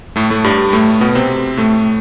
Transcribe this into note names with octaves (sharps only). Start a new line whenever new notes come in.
A2 A3
A2 A3
G2 G3
A2 A3
B2 B3
C3 C4
A2 A3